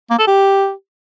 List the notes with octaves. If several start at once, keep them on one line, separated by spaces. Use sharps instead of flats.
A#3
A4
G4